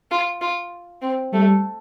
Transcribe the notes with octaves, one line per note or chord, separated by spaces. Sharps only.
F4
F4
C4
G3 A3